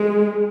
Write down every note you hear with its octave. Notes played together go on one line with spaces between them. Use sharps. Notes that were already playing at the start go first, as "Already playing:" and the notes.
Already playing: G#3